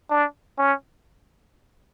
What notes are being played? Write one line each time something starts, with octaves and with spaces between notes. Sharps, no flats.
D4
C#4